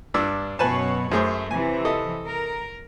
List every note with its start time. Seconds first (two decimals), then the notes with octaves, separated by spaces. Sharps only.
0.14 G2 D4 E6
0.59 F#2 B2 B4 C#5 G#5 A5
1.12 F#2 A3 G#4 C5
1.51 C3 E3 G#5
1.85 A4 D#5
2.25 A#4